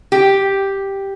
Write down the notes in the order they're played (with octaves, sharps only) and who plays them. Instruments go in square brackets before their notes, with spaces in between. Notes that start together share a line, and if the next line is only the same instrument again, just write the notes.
[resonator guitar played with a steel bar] G4